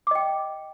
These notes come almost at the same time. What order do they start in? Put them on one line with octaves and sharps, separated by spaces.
D6 D#5 G5